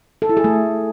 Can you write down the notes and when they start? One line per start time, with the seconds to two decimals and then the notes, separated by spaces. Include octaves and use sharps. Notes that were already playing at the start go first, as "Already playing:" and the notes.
0.22 A4
0.29 E4
0.37 G#4
0.44 A3